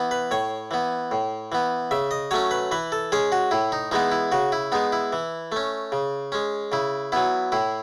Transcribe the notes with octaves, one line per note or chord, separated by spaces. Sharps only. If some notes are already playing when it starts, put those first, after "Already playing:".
Already playing: E3 B3
B4
A2 C#5
E3 B3
A2
E3 B3
C#3 E5
D#5
F#3 A3 C#4 C#5
B4
E3 B4
A4
G#3 C#4 G#4
F#4
A2 E4
D#4
E3 G#3 B3 D#4
E4
C#3 F#4
E4
G#3 B3 D#4
E4
E3
A3 C#4
C#3
G#3 C#4
C#3 E4
F#3 B3 E4
A2 E4